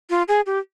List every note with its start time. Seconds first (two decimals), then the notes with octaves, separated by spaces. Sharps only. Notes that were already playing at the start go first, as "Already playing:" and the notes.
0.10 F4
0.28 G#4
0.46 G4